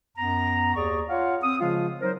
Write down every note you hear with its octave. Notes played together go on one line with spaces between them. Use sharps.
F#2 B3 A#5
D#2 G#4 D5 C#6
F4 C#5 F5 F#5
C4 D#6
C#3 F3 G#3 F4
F#3 D#4 A#4 C5